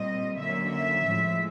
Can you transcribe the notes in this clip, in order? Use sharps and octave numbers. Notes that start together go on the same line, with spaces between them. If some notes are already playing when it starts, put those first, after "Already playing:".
Already playing: A#2 G3 C4 D#5
D3 F#3 A#3 C#4 E5
E5
A2 F3 G#3